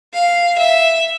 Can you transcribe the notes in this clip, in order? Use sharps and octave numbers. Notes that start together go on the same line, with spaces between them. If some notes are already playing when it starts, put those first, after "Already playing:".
F5
E5